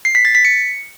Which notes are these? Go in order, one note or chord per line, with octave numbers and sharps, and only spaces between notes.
C7
B6
A6
B6
C#7